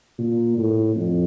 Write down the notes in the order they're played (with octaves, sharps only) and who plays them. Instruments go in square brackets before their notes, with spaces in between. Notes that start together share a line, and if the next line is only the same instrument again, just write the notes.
[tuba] A#2
A2
F2